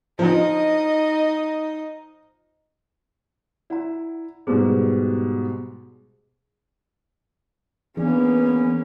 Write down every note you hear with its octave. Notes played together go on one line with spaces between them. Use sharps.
F3 D#4 D#5
E4 D5 F#5 A#5
G#2 B2 G3 G#4 C5 A#5
E3 A#3 B3 C#4 D4 G#4